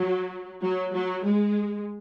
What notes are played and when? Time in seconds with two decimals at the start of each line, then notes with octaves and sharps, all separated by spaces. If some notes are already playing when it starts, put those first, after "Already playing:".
Already playing: F#3
0.63 F#3
0.94 F#3
1.24 G#3